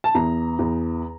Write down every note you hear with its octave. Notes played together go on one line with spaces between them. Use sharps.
A5
E2 A#5
E2